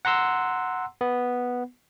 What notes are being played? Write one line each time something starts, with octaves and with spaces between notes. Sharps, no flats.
F#5 A#5 C6 E6
B3